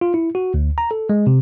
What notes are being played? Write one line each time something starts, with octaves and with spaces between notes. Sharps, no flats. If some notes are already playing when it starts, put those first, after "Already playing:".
F4
E4
F#4
D2
A#5
A4
G#3
C3